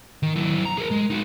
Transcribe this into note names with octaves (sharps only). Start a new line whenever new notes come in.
D#3
F#3 E4
A#5
G#4 A#4
G#3
D#4 F#4